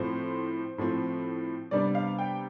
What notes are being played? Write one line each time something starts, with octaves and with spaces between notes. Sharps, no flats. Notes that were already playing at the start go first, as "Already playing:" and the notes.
Already playing: A2 F3 C4 C5
A2 F3 C4
C3 G3 B3 D4 D5
F5
G5